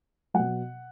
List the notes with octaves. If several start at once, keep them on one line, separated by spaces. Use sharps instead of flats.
B2 F#3 F#5